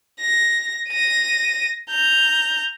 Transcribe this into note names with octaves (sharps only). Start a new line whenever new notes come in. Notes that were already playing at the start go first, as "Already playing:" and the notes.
A#6
A#6 D#7
A#5 G6